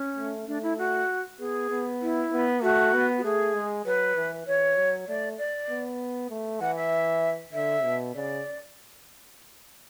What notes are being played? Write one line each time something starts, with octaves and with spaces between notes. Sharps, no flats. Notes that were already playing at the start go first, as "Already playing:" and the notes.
Already playing: C#4
A3
A3 D4
E4
F#4
B3 G#4
B3
E4
B3
A3 F#4
B3
F#4
A3 G#4
G#3
F#3 B4
E3
E3 C#5
F#3
A3 D5
D5
B3
A3
E3 F#5
E5
D3 E5
B2
C#3 D5